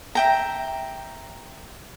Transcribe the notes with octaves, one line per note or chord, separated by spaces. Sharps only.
E5 G5 A#5